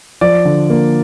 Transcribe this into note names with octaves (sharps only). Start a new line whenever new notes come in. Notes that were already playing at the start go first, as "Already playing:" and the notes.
F3 D5
D3
A#3